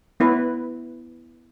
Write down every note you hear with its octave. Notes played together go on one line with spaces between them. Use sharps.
B3 E4 B4